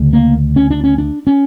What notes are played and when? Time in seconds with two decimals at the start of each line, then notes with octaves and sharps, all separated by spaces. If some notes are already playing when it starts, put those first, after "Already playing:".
Already playing: D2 C#3
0.13 A#3
0.56 C#4
0.70 D4
0.84 C#4
0.98 D4
1.27 C#4